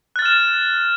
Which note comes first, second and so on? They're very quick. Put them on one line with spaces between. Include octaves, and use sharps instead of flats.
F#6 A6 F6 E7